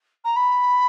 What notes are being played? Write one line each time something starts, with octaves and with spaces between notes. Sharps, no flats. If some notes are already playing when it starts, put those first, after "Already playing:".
A#5
B5